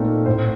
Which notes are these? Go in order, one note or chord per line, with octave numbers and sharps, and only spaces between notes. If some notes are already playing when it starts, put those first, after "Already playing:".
Already playing: A#2 A3 C4 D#4 A#4
A2 C5